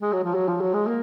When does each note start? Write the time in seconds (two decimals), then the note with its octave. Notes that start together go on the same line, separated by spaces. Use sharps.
0.02 G#3
0.12 F#3
0.24 F3
0.34 F#3
0.48 F3
0.60 F#3
0.74 G#3
0.87 A#3